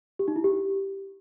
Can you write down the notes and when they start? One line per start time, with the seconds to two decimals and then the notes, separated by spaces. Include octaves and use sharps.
0.19 G4
0.28 D#4
0.36 E4
0.44 G4